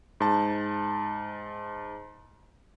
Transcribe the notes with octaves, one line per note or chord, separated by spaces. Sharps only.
G#2 A5